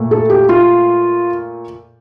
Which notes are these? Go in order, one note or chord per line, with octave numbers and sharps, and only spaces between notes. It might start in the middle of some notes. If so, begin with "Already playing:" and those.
Already playing: A#2 A3
A4
G4
F4